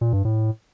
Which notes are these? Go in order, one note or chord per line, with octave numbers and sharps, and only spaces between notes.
A#2
G2
A2